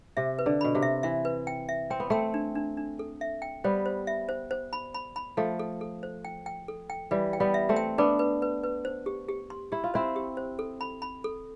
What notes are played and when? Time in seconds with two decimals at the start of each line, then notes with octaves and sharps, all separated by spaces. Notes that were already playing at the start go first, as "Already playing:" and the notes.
0.17 C3 E5
0.39 B4
0.46 D3
0.61 B2 B5
0.75 C3
0.82 E5
1.03 E3 E5
1.25 B4
1.47 G5
1.69 E5
1.90 C4 G5
2.00 B3
2.10 A3 C4 G5
2.34 D4
2.55 D4
2.77 D4
2.99 A4
3.21 E5
3.42 G5
3.64 G3 B3 C5
3.86 C5
4.07 E5
4.29 C5
4.51 C5
4.73 B5
4.94 B5
5.16 B5
5.37 F3 A3 A4
5.59 A4
5.81 A4
6.03 C5
6.25 G5
6.46 G5
6.68 A4
6.90 G5
7.11 E3 G3 B4
7.33 G5
7.40 G3 B3
7.54 E5
7.69 A3 C4
7.76 G5
7.98 B3 D4 B4
8.19 B4
8.42 B4
8.63 B4
8.85 C5
9.06 G4
9.29 G4
9.50 C6
9.72 E4 G4
9.84 F4
9.94 C4 E4 C5
10.16 G4
10.37 C5
10.59 A4
10.81 B5
11.02 B5
11.24 A4